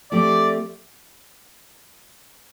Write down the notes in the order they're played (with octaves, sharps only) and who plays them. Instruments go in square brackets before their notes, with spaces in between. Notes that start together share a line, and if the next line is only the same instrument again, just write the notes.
[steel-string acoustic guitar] F3 A3 C4 G4 [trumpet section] D5